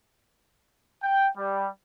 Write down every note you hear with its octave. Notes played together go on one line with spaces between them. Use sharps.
G5
G3